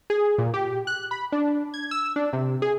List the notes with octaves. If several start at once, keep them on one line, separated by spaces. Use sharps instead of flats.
G#4
A#2
G4
F#6
B5
D4
G#6
E6
D4
C3
G#4